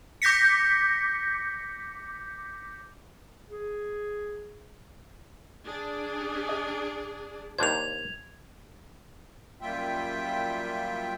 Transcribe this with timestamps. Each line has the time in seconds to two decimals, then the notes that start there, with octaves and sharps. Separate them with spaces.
0.22 D6 G6 A#6 B6 C#7
3.50 G#4
5.67 D4 G#4
6.49 D#5
7.59 D#2 D4 C5 G#6 F7
9.61 F#2 G3 A#3 F4 E5 G5